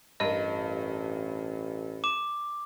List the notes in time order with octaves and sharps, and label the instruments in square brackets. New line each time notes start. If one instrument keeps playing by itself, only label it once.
[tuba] A1 [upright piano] G2 A#4 [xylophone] D#5 D#7
[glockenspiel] D6 [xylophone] E7